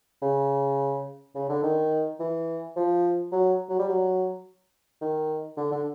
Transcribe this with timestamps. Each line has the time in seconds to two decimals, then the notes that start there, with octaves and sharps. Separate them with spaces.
0.22 C#3
1.35 C#3
1.49 D3
1.63 D#3
2.20 E3
2.76 F3
3.32 F#3
3.69 F#3
3.79 G3
3.89 F#3
5.01 D#3
5.57 D3
5.72 D3